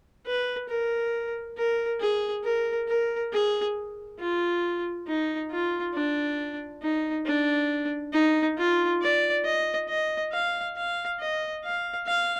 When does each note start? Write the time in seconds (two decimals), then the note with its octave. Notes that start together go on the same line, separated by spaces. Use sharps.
0.26 B4
0.69 A#4
1.57 A#4
2.00 G#4
2.44 A#4
2.88 A#4
3.33 G#4
4.20 F4
5.07 D#4
5.51 F4
5.94 D4
6.83 D#4
7.26 D4
8.13 D#4
8.57 F4
9.01 D5
9.45 D#5
9.89 D#5
10.33 F5
10.76 F5
11.20 D#5
11.64 F5
12.07 F5